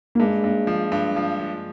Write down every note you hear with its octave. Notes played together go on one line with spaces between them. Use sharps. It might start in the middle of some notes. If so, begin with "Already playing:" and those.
A#3
G2 G#3
G2
F3
G2
F3
F3